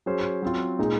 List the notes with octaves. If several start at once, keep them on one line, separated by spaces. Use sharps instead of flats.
F#3 C#4 G#4 C5
F#3 C4 F4
A#2 G#3 D#4 G#4